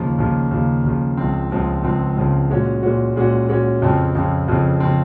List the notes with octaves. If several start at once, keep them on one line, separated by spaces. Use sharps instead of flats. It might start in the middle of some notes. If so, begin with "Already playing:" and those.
Already playing: D#2 C#3 F3
D#2 C#3 F3
D#2 C#3 F3
D#2 C#3 F3
C#2 C#3 F3 C4
C#2 C#3 F3 C4
C#2 C#3 F3 C4
C#2 C#3 F3 C4
A#2 G#3 C#4 F#4
A#2 G#3 C#4 F#4
A#2 G#3 C#4 F#4
A#2 G#3 C#4 F#4
F2 C#3 F3 C4
F2 C#3 F3 C4
F2 C#3 F3 C4
C#3 F3 C4